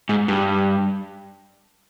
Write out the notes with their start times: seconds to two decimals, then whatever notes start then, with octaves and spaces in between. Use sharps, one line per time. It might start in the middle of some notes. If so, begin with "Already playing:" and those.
0.09 G#2
0.28 G2